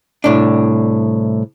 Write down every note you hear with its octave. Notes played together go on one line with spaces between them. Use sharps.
C2 A2 D4